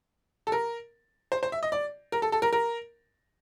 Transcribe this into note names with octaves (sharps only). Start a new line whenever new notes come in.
A4
A#4
C5
C5
E5
D#5
D5
A#4
A4
A4
A#4
A#4